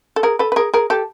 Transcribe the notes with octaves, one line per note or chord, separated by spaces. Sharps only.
A4
G#4 A#4
A4 B4
B4
G#4 A#4
G#4 A#4
G4 A4